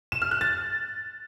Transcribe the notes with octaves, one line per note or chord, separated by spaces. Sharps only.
E7
F6
F#6
A6